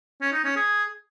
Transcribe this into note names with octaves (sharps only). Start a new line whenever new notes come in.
C#4
D#4
C#4
G#4